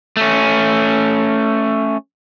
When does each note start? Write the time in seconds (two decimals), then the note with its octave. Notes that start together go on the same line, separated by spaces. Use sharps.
0.17 A3 C#4